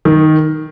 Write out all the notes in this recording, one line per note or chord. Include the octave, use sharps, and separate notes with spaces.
D#3